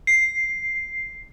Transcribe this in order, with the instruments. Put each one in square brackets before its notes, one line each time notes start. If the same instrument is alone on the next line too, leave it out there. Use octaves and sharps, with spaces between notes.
[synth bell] C7